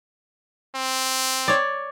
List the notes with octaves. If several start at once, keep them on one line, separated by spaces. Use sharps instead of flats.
C4
C#5 D5